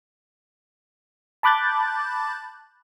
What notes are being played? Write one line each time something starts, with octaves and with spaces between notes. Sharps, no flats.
A5 B5 D6 F#6 G6 A6